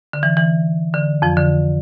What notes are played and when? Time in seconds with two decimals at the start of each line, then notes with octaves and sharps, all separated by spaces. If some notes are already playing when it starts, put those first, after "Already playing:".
0.13 D3
0.23 E3
0.37 E3
0.94 D3
1.22 F2 F3
1.37 D3